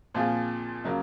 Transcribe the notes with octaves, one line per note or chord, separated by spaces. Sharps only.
A#2 F3 C4 F4 G#4
C#3 F#3 A#3